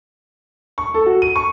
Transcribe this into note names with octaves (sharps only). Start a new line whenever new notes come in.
C#6
A4
F#4
D#7
C#6